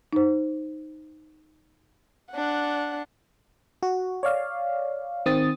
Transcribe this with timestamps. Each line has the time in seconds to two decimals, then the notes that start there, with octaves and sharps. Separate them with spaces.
0.13 D#4 C5
2.31 D4 F#5
3.83 F#4
4.23 C#5 D5 F5
5.26 D#3 C4 D#6 A6